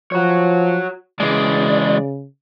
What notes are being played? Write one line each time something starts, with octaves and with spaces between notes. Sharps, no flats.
F3 F#4 C#5
C#3 E3 G#3 D5